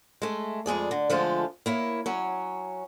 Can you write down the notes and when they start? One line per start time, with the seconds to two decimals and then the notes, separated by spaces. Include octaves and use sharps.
0.22 G#3 A3
0.66 F2 G#3 G#4 D5
0.91 D3
1.10 D3 F3 G#3 A3 F4
1.66 A#3 E4 C#5
2.06 F#3 C#4